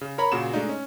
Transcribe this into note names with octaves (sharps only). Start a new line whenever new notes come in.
C#3
A#4 C#5 A#5 B5
A#2 C#3 F#4 E7
G#3 A3 D4 D#4
C#4